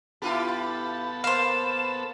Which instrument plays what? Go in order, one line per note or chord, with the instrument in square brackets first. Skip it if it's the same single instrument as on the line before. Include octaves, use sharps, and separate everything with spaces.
[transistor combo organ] B3 A4 [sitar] E4 F4 G4
[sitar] A#3 [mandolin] C5 F5 [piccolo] E7